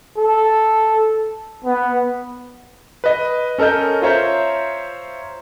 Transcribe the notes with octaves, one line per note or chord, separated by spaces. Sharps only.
A4
B3
B4 D#5
C#4 A4 A#4 D#5 G6
F4 C5 C#5 E5 A#5 G6